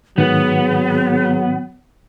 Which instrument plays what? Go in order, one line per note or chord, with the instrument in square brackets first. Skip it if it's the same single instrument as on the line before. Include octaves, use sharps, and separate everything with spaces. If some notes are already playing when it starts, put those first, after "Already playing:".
[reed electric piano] G#2 D#3 [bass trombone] F#3 [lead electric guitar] B3 [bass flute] G#4